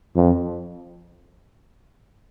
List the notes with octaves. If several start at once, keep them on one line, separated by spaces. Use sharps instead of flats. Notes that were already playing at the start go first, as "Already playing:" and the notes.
F2